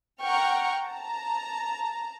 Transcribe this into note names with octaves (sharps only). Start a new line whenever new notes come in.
F#5 G5 A#5 C#6 F6
A5 A#5